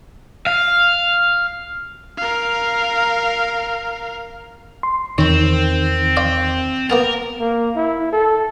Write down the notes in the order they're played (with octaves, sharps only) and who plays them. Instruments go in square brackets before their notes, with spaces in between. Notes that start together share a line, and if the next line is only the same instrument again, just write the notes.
[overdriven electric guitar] F5
[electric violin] A#4 F5
[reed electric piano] C6
[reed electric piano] E2 [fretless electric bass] D#3 [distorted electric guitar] C4 [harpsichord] C#5 B5
[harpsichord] D5 F5 C6
[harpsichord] A#3 B3 A5 [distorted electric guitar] A#4
[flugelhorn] A#3
E4
A4